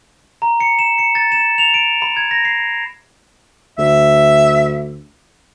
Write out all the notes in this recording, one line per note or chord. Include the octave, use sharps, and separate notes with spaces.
A#5
C#7
E7
C#7
A6
E7
F7
D7
B5
G#6
A#6
C7
D2 E5